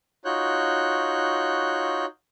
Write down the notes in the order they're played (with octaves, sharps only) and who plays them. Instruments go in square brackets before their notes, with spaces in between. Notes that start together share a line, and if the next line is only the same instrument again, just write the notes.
[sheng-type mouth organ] D#4 F4 F#4 C#5 F#6 G6